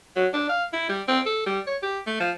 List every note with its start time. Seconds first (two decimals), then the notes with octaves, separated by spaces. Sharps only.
0.16 F#3
0.33 D4
0.49 F5
0.73 E4
0.89 G3
1.08 C4
1.26 A4
1.46 G3
1.67 C#5
1.83 G4
2.07 A3
2.20 F3